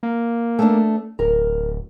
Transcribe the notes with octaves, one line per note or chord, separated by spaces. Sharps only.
A#3
A3 B3 D4
D1 A#4